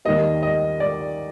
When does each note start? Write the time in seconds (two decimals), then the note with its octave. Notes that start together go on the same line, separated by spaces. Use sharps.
0.05 D#2 D#3 G3 A#3 D#5
0.43 D#5
0.80 D5